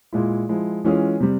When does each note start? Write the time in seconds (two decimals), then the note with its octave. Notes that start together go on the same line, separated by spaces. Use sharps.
0.13 A#2 G#3 E4
0.49 F3 G#3 E4
0.84 E3 G#3 C#4 F4 G#4
1.20 C3 G3